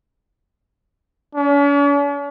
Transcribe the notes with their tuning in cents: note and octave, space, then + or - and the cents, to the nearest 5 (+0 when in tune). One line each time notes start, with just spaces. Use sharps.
C#4 +45